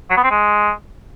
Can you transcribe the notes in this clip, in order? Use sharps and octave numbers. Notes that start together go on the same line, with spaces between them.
F#3
B3
C4
G#3